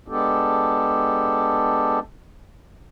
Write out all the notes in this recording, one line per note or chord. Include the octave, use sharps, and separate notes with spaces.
G#3 B3 D4 G4 A4